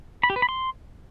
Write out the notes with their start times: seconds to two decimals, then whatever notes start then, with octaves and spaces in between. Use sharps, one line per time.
0.23 B5
0.30 G4
0.36 B4
0.42 B5
0.49 C6